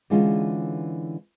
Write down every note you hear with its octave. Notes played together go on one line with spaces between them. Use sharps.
D3 E3 G#3 C#4 F4